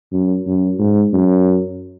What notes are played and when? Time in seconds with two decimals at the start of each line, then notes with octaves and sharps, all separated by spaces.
0.12 F#2
0.46 F#2
0.79 G#2
1.13 F#2